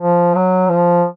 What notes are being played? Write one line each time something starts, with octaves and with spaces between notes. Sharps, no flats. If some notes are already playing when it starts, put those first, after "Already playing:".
F3
F#3
F3